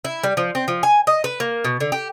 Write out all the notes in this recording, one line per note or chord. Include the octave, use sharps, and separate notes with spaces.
E4
G3
F3
C4
F3
G#5
D#5
B4
A#3
B2
D3
G4